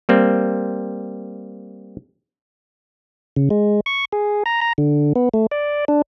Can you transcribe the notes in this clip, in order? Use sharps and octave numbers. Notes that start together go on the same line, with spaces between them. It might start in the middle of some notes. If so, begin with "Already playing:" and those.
G3 A#3 C4
C#3
G#3
C#6
G#4
A#5
A#5
D3
B3
A3
D5
D4